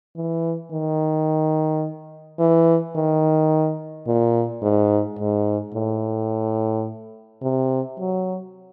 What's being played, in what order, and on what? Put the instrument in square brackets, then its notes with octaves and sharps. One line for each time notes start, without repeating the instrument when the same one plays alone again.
[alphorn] E3
D#3
E3
D#3
A#2
G#2
G#2
A2
C3
F#3